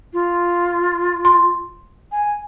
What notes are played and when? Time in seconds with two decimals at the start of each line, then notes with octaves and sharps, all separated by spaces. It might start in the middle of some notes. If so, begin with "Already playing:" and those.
0.13 F4
1.25 C6
2.12 G#5